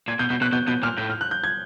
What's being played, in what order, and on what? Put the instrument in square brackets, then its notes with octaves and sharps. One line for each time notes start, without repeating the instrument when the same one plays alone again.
[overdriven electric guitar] A#2 [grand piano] G#6
[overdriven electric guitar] B2 [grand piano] G6
[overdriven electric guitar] B2 [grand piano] G6
[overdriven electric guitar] B2 [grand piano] F#6
[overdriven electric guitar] B2 [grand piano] G6
[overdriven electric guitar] B2 [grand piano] G6
[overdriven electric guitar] A#2 [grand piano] F6
[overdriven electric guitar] A2 [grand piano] G6
[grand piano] F6
F#6
G6
G#6